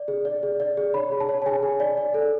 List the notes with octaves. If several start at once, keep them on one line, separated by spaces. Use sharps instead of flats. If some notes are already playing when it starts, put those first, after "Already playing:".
Already playing: D5
G#4
D5
G#4
D5
G#4
C#5 B5
G#4
A5
C#5
A5
G#4 G#5
G#4
D5
D5
A4